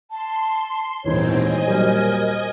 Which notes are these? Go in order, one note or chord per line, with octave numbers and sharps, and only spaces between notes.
A5 C6
D#1 G#2 B2 E3 C4 D#4 C5 C#5
D#5 G#5
A#2 F#3 G3 A#4